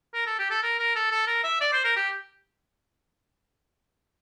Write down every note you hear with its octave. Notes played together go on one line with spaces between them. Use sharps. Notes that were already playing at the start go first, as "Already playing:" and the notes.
A#4
A4
G4
A4
A#4
A#4
A4
A4
A#4
E5
D5
C5
A#4
G4